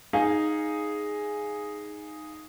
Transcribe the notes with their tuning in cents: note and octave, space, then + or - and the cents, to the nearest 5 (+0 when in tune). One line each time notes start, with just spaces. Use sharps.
D#4 +0 G#4 +0 F5 +0